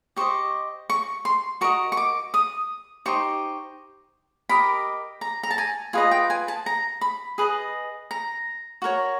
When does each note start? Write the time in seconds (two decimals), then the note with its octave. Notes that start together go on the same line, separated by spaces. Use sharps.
0.17 G4 C5 D#5 C#6
0.90 C#6
1.25 C6
1.61 F#4 A#4 D#5 C#6
1.92 C#6
1.97 D6
2.34 D#6
3.06 D#4 G4 C5 C#6
4.49 G4 A#4 D#5 B5
5.21 A#5
5.43 A#5
5.51 A5
5.58 G#5
5.93 F4 G#4 B4 D#5 G#5
6.11 G5
6.30 G#5
6.48 A5
6.66 A#5
7.01 B5
7.38 G#4 B4 D#5
8.11 A#5
8.82 F#4 A#4 C#5